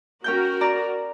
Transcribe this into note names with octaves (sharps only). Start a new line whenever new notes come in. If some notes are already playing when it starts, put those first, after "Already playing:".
C#4 F#4 A#4 G5 G6
D5 A#5